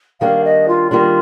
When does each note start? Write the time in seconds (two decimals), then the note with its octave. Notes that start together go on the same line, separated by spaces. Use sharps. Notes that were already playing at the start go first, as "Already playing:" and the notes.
0.21 D#3 G3 A#3 D4 F5
0.44 D#5
0.68 F4
0.91 D#3 G3 A#3 D4 F4